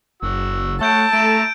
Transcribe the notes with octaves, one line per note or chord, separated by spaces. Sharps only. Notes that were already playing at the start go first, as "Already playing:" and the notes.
F#1 F#4 E6
A3 C#5 F#5 A5 E6 G6 D7
A3 A4 E5 A#5 D7 E7